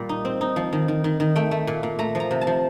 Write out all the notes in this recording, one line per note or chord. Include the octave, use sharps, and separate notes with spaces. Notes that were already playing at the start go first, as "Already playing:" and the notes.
Already playing: A#2 G3
D#4
C4
D#4
F3
D#3
D#3
D#3
D#3
A3 G5
A3
A#2
A#2
A3 A#5
F3
A#5
C3
A5
F3